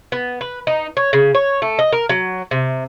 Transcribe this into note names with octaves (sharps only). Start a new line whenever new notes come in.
B3
B4
D#4
C#5
C#3
C#5
A3
D#5
A#4
F#3
C3